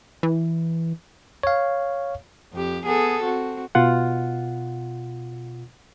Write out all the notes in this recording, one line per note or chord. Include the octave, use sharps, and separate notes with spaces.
E3
C#5 F5
F2 G4
B3 G#4 A4
C4 F#4
B2 F4 F#5